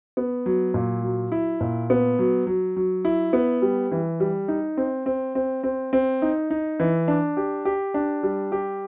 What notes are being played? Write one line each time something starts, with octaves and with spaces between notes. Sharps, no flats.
B3
F#3
A#2
F#3
E4
A#2
B3
F#3
F#3
F#3
E4
B3
G3
E3
G3
D#4
C4
C4
C4
C4
C4
D#4
D#4
E3
D4
G4
G4
D4
G3
G4